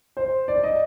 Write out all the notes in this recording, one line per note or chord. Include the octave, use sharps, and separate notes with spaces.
C5
D5
D#5